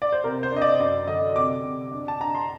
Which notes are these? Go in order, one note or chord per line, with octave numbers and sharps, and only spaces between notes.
D5
C5
C3 A#4
C5
D4 D#5
D5
F#2 D5
D3 D#5
C3 D6
C3
D4
A5
D4 A#5
C6